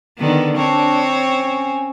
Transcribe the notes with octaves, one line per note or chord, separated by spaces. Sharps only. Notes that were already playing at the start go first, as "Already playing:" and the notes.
D3 D#3 B3
C4 D4 C#5
C#4